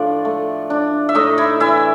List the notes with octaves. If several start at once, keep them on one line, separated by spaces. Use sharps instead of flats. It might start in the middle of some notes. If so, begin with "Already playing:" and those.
Already playing: A2 F3 D4 D5
A3
D4
E5
A2 D#4 D#5
E4 E5
E3 E4 E5